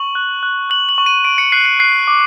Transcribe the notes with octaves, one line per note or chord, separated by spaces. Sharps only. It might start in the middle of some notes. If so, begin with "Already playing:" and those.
Already playing: C#6 F#7
F#6
F#6
F#6 F#7
F#7
C#6
D#7
C#6 D7
C#7
F#6 C7
C7
F#6 C7
D6